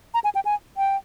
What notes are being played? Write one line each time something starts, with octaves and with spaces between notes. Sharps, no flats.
A#5
G#5
G5
G#5
G5